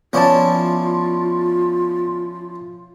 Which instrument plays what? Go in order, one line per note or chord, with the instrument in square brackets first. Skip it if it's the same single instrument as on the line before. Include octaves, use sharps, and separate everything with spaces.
[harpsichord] F3 C#4 E4 [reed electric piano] B3 D5 A5 [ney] F4